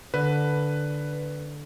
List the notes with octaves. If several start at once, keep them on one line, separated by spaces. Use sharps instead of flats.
D3 B4